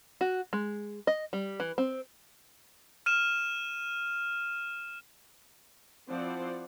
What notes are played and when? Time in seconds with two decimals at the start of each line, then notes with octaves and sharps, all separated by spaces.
0.21 F#4
0.53 G#3
1.07 D#5
1.33 G3
1.60 E3
1.78 C4
3.06 F6 D#7 E7
6.07 F3 C4 E4 C5 D5 F#5